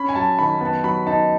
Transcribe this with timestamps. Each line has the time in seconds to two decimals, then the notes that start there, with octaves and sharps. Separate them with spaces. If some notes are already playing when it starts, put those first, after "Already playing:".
Already playing: C#4 B5
0.09 G#5
0.15 F#3 A5
0.38 D#3 B5
0.61 B3 A5
0.84 F#3 B5
1.07 D#4 A5